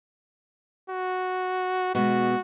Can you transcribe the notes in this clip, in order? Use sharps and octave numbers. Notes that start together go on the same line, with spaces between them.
F#4
B2 G#3 F#4